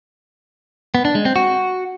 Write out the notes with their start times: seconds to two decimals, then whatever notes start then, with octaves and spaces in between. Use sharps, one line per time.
0.95 B3
1.05 D4
1.15 G#3
1.25 C4
1.36 F#4